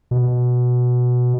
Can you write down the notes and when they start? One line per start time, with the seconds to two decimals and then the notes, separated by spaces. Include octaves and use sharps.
0.11 B2